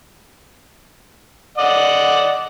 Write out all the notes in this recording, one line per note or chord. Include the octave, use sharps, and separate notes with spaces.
D5 D#5 F#5